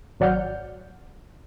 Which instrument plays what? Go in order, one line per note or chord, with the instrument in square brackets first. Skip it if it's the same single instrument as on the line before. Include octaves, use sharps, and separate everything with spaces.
[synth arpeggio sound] G#1 F#3 D5 F#5 F6 G6